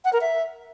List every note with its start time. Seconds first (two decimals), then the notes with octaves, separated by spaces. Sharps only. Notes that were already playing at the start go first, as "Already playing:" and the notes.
0.04 F#5
0.13 A#4
0.21 E5